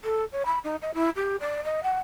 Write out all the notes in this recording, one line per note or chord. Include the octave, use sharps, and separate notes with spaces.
A4
C#5
B5
D#4
D#5
E4
G4
D5
D#5
F#5